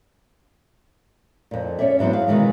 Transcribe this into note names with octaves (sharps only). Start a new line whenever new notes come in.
F2 A#2
C#4 C#5 D5 E5
G#2 E3 F#3 B3 C4
F5
B2 D#3 E3 G#3